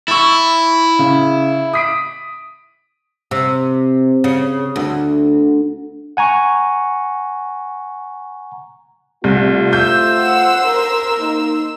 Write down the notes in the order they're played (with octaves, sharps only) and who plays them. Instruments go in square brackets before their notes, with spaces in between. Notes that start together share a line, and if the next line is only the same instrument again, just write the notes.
[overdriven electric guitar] E4 [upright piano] C#6 E6 A6
[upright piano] C#3
D#6 B6 D7
[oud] C3
C#3
D2
[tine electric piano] F#5 G#5 A#5 C#6
[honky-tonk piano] C2 [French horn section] A3 F4
[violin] C5 E6 [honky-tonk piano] G6
[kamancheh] F#5
A#4
[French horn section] A#3 D#4